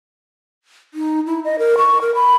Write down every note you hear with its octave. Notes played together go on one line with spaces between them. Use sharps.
D#4
E4
D#5
A#4
C#6
A#4
B5